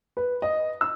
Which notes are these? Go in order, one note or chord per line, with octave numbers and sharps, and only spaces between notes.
B4
D#5
E6